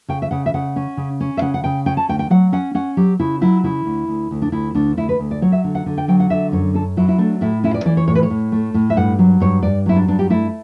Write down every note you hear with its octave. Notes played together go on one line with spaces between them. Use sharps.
C#3 G5
E5
C#3 F#5
E5
C#3 F#5
C#4
C#3
C#4
E5
C#3 F#5
F#5
C#3 G5
C#4 G5
A5
D2 G5
G5
F#3 F#5
C#4 F#5
C#4 F#5
F#3 G4
C#3 E4
F#3 E4
C#3 E4
D2
D2
D2
D4
D2 E4
D2 D4
D2 E4
B4
D2
D5
F#3 C#5
E5
D3
F#5
D3
G5
F#3 G5
F#5
D3 E5
F#2 C#5
C#4 A4
F#3 E4
E4
A3 D4
A2 E4
C#4 E4
D5
E3 D5
C#5
A2 C#5
B4
C#5
A2
A3
A2
E5
G2 F#5
F#3
G2 C#5
G2 D5
F#3 E4
D4
G2 D4
G4
A3 E4